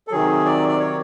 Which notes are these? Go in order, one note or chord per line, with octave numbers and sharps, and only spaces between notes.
A4
C3 D#3 F#3 G#4
D5
D5
C#5